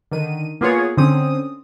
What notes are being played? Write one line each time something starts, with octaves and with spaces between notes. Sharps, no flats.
D3 D#3 D#7
A#3 B3 F4 G#4 C#5
D3 C4 C#4 D#6